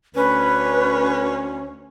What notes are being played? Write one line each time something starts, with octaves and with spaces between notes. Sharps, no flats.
D2 C#4 B4